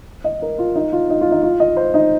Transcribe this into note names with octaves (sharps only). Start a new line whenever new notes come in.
D#5
A#4
F4
D#4
F4
D#4
F4
D#4
F4
D#5
C5
D#4